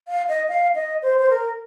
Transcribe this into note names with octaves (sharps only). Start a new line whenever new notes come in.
F5
D#5
F5
D#5
C5
C5
A#4